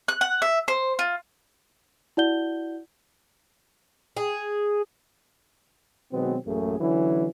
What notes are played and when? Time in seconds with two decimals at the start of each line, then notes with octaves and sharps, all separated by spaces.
0.08 F#6
0.21 F#5
0.42 E5
0.68 C5
0.99 F4
2.17 E4 F#4 D5 F#5 G6 G7
4.17 G#4
6.12 B2 D#3 F#3 G#3 B3 C4
6.46 A1 F#2 A3 A#3 G#4
6.80 D3 E3 F#3 C#4 E4